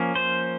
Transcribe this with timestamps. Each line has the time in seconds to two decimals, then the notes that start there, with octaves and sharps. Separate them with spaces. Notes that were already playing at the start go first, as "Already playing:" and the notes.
Already playing: F3 A#3 C#4
0.15 C5